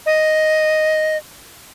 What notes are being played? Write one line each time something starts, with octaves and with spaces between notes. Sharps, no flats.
D#5